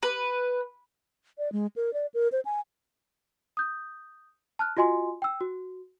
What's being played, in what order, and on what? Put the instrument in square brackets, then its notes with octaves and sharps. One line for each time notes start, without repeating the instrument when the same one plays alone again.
[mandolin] B4
[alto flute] D5
G#3
A#4
D5
A#4
C5
G#5
[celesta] D#6 G6
A5 F6 F#6
F4 F#4 D#5 G#5 C6
G5 E6
F#4